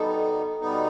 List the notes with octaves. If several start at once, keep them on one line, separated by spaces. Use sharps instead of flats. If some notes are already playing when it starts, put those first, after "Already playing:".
Already playing: B2 G3 B3 D#4 A4
B2 G3 B3 D#4